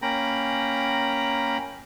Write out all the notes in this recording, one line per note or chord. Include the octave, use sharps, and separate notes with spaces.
A#3 C#4 G5 A#5 B5